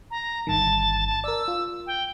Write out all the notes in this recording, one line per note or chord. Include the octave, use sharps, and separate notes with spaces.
A#5
G1 G2 D#3 A5
A5
A#4 D5 E6
F4
G5